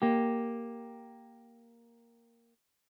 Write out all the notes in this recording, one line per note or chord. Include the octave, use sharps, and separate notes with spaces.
A#3 G4